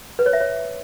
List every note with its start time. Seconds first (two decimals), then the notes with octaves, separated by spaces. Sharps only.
0.19 B4
0.26 C#5
0.33 E5
0.40 C#5